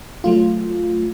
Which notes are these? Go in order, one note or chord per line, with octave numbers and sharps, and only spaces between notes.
F#3 A3 F4